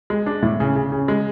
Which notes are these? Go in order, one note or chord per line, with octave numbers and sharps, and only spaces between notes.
G#3
D4
A2
C#3
C#3
C#3
G#3